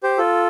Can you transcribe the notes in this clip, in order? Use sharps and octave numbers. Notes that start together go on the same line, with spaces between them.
G4 C5
F4 A4